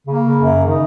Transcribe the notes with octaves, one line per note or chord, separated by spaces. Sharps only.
C#3 A#3
C#3
F#2
C#3
D#3 D#4